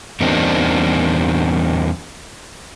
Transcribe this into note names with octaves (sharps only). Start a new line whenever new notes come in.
E2 G3 A#3 C4 D4 D#4